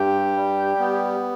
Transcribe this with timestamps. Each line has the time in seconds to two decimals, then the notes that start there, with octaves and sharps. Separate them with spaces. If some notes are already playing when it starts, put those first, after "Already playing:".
Already playing: G2 G4
0.36 G3
0.80 B3